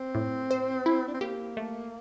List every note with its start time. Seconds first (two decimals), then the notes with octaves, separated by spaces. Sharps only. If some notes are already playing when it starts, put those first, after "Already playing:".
Already playing: C4
0.15 A2
0.51 C5
0.86 E4
1.08 D4
1.14 C4
1.21 A#3 G4
1.57 A3